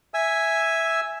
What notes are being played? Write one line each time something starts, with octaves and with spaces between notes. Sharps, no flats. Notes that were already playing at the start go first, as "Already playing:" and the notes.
E5 G#5 E6